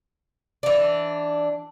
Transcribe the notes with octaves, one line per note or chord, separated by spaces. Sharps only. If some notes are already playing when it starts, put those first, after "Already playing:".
E3 D4